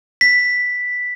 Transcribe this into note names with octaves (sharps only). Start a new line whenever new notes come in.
B6